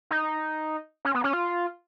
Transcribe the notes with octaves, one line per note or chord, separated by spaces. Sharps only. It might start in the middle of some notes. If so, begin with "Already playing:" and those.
D#4
C#4
B3
C#4
F4